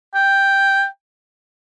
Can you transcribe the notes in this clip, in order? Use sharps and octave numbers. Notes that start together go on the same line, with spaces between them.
G5